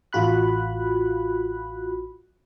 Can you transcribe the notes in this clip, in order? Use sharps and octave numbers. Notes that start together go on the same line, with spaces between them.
A1 F4 F#4 B5 F#6